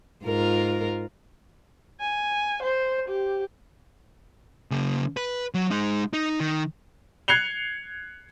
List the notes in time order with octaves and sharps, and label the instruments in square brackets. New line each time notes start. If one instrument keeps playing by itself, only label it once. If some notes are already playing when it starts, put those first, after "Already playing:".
[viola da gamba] G#2 F4 A#4
[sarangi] G#5
C5
G4
[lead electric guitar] C#3 A#3
B4
F#3
G#3 D#4
D#4
D#3
[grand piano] F#6 G#6 C7 C#7 F7 G7